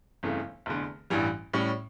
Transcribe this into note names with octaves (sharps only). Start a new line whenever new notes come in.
G1 F2 C#3 E3 A3
F1 E2 D3
A1 G2 E3 G3
A2 G3 C#4